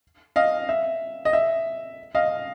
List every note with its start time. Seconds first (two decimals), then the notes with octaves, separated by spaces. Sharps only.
0.36 D#5 F5
0.69 E5
1.25 D#5
1.33 E5
2.15 D#5 F5